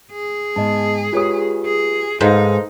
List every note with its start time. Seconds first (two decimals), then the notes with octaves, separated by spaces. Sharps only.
0.12 G#4
0.56 G#2 B3 D#5 A5
1.13 G#3 F4 G4 B4 C#5 D#6
1.65 G#4
2.21 G#2 D#4 G#4 A4 B4 C5 D#5 F5